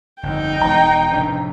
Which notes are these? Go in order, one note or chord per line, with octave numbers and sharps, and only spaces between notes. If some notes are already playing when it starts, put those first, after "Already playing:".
G1 F2 D#4 G5
E1 A#5
F1 A2 D4